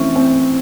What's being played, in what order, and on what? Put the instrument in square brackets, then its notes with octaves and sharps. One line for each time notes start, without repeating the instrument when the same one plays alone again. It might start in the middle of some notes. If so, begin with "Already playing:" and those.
Already playing: [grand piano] E3 A3 C4 [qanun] C#4
[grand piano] C4